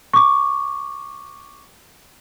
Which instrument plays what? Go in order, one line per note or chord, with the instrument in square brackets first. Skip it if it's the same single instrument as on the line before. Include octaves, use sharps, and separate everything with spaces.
[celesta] C#6 D6